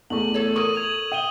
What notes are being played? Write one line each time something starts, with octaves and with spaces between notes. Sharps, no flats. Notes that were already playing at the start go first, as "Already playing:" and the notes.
E2 A3 C#6 F#7
A4 C#5
A4 A#4 C#5 C#6 D#6 D#7
G#6 F7 F#7
E5 G5 D#6 D#7 G7